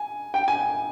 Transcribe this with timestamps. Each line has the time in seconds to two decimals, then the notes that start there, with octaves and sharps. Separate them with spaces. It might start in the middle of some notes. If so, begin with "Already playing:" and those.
Already playing: G#5
0.34 G5
0.48 G#5